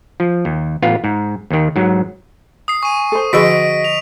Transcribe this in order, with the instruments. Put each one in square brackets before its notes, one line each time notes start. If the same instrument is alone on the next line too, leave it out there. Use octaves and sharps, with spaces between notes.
[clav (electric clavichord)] F3
D#2
A1 B3 F4 F5
G#2
D#2 D#3
G#2 F#3
[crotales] D#6 C7
[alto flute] G#5 [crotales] C#6 D#7
[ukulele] A4 C5
[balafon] D3 F3 B5 [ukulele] F#4 G#4 [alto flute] D#5 [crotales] B6 D7
[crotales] F7